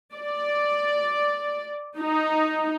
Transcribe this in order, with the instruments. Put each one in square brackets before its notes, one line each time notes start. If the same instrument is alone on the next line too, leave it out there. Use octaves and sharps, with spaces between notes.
[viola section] D5
D#4